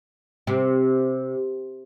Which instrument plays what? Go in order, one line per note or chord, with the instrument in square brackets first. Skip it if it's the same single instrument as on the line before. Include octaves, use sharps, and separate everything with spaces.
[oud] C3